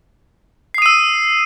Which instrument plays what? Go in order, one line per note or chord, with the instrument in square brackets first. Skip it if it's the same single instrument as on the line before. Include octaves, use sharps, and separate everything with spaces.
[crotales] C7
D#6
D#7
E6